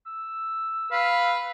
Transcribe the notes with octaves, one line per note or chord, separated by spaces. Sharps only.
E6
B4 F5